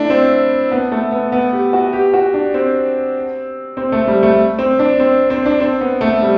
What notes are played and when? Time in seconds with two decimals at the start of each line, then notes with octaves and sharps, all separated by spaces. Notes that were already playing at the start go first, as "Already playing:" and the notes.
Already playing: A3 D4 E4
0.10 C4
0.72 B3
0.92 A3
1.12 B3
1.32 B3
1.53 G4
1.73 F#4
1.93 G4
2.13 F#4
2.34 D4
2.54 C4
3.77 C4
3.92 A3
4.08 G3
4.23 A3
4.59 C4
4.79 D4
5.00 C4
5.30 C4
5.45 D4
5.60 C4
5.81 B3
6.01 A3
6.22 G3